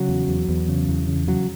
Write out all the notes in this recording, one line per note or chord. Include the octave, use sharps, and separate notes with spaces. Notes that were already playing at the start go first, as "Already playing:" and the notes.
Already playing: C#3 F#3
E2
E2
E2
C#3
E2
C#3
C#3 F#3